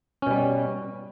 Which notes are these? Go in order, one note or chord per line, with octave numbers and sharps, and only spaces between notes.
B2 G3 C#4